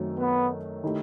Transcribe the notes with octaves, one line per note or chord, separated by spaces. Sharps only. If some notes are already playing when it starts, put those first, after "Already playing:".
Already playing: F#2 D#3 F#3 A3 C4
B3
D#3 A3 E4 G4